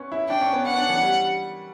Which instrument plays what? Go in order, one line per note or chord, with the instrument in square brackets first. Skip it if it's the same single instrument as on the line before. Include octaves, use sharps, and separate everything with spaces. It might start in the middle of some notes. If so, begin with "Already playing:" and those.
Already playing: [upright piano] B3 C#4
E4
[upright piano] D4 [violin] G5
[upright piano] C#4
B3
[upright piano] C#4 [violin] F#5
[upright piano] D4
E3
G3